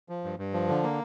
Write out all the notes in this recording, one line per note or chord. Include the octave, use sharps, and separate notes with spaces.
F3
G2
G2
F3
D3
A#3